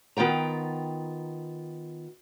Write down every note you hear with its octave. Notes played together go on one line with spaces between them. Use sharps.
D#3 B3 F4 G5 A#5